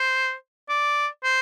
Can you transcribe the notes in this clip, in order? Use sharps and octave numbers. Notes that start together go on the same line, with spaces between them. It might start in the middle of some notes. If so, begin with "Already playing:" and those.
Already playing: C5
D5
C5